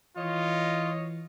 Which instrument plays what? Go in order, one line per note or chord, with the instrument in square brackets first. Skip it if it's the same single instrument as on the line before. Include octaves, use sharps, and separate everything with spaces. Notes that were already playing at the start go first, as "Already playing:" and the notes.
[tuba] E3 [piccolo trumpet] F4 [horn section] C#5 D#5